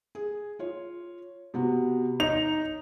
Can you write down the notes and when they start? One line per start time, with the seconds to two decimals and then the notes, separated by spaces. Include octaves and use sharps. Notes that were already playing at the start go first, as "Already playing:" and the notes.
0.15 G#4
0.59 F4 C#5
1.54 C3 B3 F#4
2.20 D#4 C#5 F7